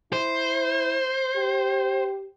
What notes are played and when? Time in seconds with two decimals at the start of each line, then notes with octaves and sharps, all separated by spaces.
0.13 E4 C5
1.36 G4